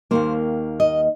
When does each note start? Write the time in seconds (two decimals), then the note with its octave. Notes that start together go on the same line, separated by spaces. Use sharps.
0.11 D#2 D#3 A#3 C5
0.80 D#5